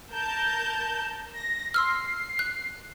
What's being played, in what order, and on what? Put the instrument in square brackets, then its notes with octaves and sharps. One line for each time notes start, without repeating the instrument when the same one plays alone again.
[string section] A#4 A5 G6
A#6
[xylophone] C6 E6 F6 [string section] C7
[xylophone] F#6